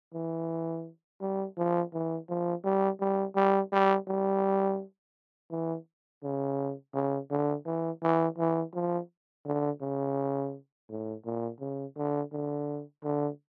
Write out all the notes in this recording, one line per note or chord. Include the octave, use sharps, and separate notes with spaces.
E3
G3
F3
E3
F3
G3
G3
G3
G3
G3
E3
C#3
C#3
D3
E3
E3
E3
F3
D3
C#3
A2
A#2
C#3
D3
D3
D3